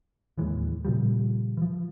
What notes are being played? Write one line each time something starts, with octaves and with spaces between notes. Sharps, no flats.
D1 D#2 E3 G#3
A#2 C#3 F3 G3
E3 F3